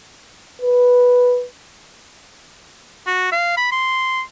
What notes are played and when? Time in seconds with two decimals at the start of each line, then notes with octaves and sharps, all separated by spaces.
0.62 B4
3.07 F#4
3.32 F5
3.57 B5
3.72 C6